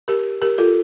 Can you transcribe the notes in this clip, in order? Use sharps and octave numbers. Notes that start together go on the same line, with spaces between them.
G4 A#4
G4 A#4
F4 A4